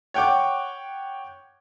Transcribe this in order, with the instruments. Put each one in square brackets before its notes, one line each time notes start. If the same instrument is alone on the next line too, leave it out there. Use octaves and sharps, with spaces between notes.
[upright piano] C#5 F#5 G5 C#6 D6